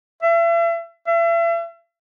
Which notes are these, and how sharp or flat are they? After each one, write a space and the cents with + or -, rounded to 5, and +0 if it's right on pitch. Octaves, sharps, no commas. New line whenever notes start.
E5 +40
E5 +40